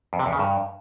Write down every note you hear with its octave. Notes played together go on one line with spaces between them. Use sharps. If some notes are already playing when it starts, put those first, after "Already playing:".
F2
C3
E2
C#3
G2